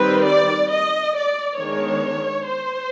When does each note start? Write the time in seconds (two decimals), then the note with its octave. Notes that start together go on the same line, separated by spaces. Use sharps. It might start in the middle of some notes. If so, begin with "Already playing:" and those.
Already playing: D#3 G3 C4 B4
0.28 D5
0.71 D#5
1.16 D5
1.59 D#3 G#3 B3 D4 C#5
2.47 C5